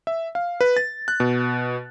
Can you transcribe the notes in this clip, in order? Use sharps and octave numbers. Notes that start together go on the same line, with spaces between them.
E5
F5
B4
A6
F#6
B2